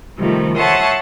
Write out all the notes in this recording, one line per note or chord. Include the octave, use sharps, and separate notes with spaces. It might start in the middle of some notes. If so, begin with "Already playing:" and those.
C3 D#3 F3 G3 A3
C#5 E5 F#5 A5 C6 D#6